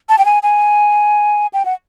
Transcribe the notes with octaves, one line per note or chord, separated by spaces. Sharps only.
A5
G5
G#5
G#5
G5
F#5